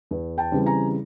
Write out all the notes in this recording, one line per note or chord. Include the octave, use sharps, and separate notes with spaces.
E2
G5 A5
C#3 E3 G3 C4
G#5 A#5